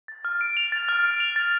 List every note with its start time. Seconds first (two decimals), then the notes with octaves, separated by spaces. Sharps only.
0.08 A6
0.25 F6
0.41 D7
0.57 F7
0.72 A6
0.89 F6
1.05 D7
1.20 F7
1.36 A6